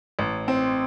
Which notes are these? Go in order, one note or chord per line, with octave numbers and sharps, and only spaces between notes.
A1
C4